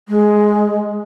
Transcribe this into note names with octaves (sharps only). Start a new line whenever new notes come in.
G#3